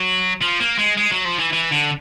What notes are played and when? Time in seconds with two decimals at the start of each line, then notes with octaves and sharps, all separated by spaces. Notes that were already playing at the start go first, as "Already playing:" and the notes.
Already playing: F#3
0.42 F3
0.61 A#3
0.78 G#3
0.97 G#3
1.11 F#3
1.25 F3
1.39 E3
1.53 E3
1.71 D3